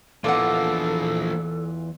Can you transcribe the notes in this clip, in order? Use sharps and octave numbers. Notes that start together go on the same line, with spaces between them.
E2 E3 F3 A#3 F4 A4 D5 F#5